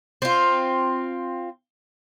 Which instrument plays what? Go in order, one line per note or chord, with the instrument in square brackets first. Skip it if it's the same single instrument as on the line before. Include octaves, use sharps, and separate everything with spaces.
[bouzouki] C4 F4